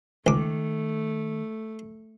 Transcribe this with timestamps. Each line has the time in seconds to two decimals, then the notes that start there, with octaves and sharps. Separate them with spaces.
0.27 C#2 D#3 A3 D6